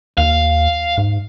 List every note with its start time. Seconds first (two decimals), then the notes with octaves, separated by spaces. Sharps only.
0.18 D#2 F5
0.98 G#2